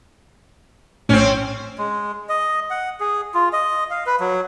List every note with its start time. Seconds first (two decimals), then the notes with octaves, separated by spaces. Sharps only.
1.09 A#1 A2 C4 C#4
1.78 G#3
2.29 D#5
2.70 F#5
3.00 G#4
3.34 F4
3.53 D#5
3.91 F5
4.06 B4
4.20 F#3